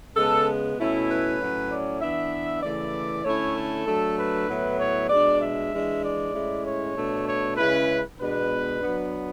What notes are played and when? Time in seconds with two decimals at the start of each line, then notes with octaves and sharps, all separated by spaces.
0.15 C#3 G#3 B3 A4
0.77 B2 A3 C#4 E4
1.09 B4
1.39 A2 F#3 C#4
1.70 D5
2.01 E3 B3 D4 E5
2.63 C#3 E3 A3 E4 D5
3.25 D3 A3 C#4 E4 C#5
3.56 A4
3.86 F#3 A3 D4
4.17 B4
4.48 A2 F#3 B3 E4
4.79 C#5
5.09 B2 G#3 D4 D5
5.41 E5
5.72 E3 G#3 D4
6.03 D5
6.33 A2 G#3 C#4 E4
6.64 C#5
6.95 B2 A3 D4
7.27 C#5
7.57 C#3 G#3 C#4 E4 B4
8.19 B2 G#3 B3 D4 B4
8.80 F#3 B3 D4